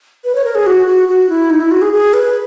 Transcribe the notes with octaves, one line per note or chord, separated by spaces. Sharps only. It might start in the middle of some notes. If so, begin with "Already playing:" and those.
B4
C#5
A#4
G#4
F#4
F#4
F#4
E4
D#4
E4
F#4
G#4
G#4
B4